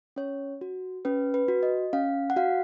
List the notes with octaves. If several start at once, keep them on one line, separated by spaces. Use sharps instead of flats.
C#4 C#5
F#4
C#4 B4
B4
F#4
D#5
C#4 F5
F#5
F#4 F5